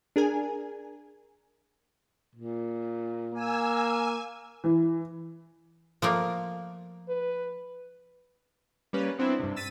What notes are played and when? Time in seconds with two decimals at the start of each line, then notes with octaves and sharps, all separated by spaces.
0.16 D4 G#4 A#4 G#5
2.35 A#2
3.34 A#3 G#5 E6
4.64 E3
6.02 F3 A3 A#3
7.09 B4
8.93 G3 A#3 C#4 B4
9.18 B3 C4 D4 E4
9.39 G2 C3
9.56 E6 A6 B6 D#7